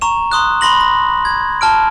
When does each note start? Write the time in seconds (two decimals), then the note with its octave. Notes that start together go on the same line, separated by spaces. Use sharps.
0.01 A#5 C#6 E7
0.32 A#5 C6 D#6 F#6
0.61 B5 C6 A#6 F#7
0.80 A#6
1.25 G#6
1.61 A5 F6 D7